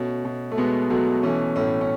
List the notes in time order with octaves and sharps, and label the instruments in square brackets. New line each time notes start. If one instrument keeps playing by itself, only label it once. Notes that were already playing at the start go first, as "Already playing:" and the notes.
Already playing: [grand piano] B2 A3 C#4
B2
A3
B2 G#3 B3
B2 F#3 A3
E3 A3 C#4
A2 A3 C#4
C#4